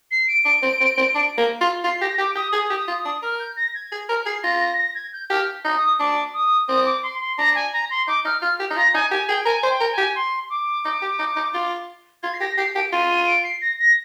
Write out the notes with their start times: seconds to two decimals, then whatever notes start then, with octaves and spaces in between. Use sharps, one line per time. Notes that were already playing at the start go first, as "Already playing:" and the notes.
0.11 C7
0.28 D7
0.45 D4
0.62 C4
0.80 C4
0.98 C4
1.15 D4
1.38 A#3
1.61 F4
1.84 F4 C7
2.01 G4 A#6
2.18 G4 D6
2.36 G4 D#6
2.53 G#4 D#6
2.70 G4
2.76 D#6
2.88 F4
2.99 D#6
3.05 D4
3.22 A#4 F6
3.40 G6
3.56 A#6
3.75 G#6
3.92 G#4
4.09 A#4 F6
4.26 G#4 C7
4.43 F4 A#6
4.61 A#6
4.78 A#6
4.95 G#6
5.13 G6
5.30 G4 F6
5.65 D#4
5.77 D#6
5.99 D4 D6
6.33 D#6
6.68 C4 D#6
6.85 D6
7.03 C6
7.21 C6
7.38 D4 A#5
7.55 G#5
7.73 A#5
7.91 C6
8.08 D#4 D6
8.25 D#4 F6
8.42 F4 F6
8.60 G4
8.70 D#4
8.76 F4 A#5
8.94 D#4 G#5
9.11 G4 G#5
9.29 G#4 G5
9.45 A#4 G#5
9.63 C5
9.70 G5
9.81 A#4
9.92 G#5
9.98 G4
10.15 C6
10.50 D6
10.85 D#4
11.02 G4
11.19 D#4
11.36 D#4
11.54 F4
12.23 F4 G#6
12.34 C7
12.40 G4 A#6
12.57 G4 C7
12.75 G4 D7
12.92 F4 D#7
13.10 D#7
13.27 D7
13.44 C7
13.61 A#6
13.79 A#6